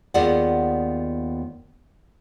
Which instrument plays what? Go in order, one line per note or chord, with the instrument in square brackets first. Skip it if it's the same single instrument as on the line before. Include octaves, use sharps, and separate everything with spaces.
[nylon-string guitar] D#2 B3 F4 G#4 D5 F#5